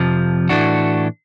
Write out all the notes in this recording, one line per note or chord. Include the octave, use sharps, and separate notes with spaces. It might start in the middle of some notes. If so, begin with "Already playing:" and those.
Already playing: F2 C3 F3
A2 E3 A3 D4 F#4